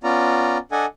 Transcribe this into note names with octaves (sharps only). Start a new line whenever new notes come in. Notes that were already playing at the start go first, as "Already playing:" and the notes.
B3 C#4 F4 D5 A#5
D4 A4 D#5 F#5 G#5